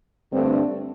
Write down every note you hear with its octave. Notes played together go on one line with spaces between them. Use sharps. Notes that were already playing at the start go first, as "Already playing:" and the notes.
G2 D3 A3 C4